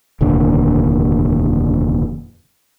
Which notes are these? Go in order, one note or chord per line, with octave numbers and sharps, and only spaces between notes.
F1 D#2 A#2 D3